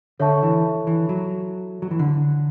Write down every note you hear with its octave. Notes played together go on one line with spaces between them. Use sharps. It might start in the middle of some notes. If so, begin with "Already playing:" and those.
D3 A4 C#5 E5 A5 C#6
E3
E3
F#3
F#3
E3
D3